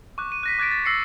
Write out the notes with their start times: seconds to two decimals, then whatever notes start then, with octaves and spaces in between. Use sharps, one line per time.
0.18 C#6 D6 F#6
0.32 D#7
0.43 F#6 A#6 B6
0.59 D6 F#6 G#6 A6 B6 D7
0.71 A6
0.85 E6 A#6 C7 C#7